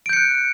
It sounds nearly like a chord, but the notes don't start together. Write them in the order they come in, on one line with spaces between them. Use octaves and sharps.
D7 G6 C#7 F#6